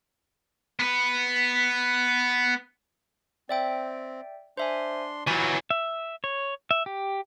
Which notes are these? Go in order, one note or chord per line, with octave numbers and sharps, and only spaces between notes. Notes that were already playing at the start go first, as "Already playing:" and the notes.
B3 B4
C4 D5 E5 G5
D4 C5 E5 G#5 C6
E3 F#3 B5 C#6 F6 G6 A6
E5
C#5
E5
G4